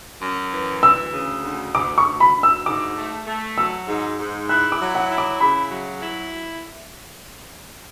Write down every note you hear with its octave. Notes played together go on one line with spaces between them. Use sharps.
F#2
E3
D2 E6
C#3
D2
D2 D6
C#6
D2
B5
D2
E6
G#2 D6
A3
A3
F#3 E6
G#2
G#2
E4 F#6
D6
F#3
F#5
E4
D6
C#3 B5
F#3
E4